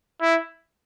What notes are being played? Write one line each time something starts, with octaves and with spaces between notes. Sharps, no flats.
E4